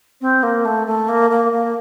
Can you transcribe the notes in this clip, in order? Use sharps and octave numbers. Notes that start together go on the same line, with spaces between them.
C4
A#3
A3
A3
A#3
A#3
A#3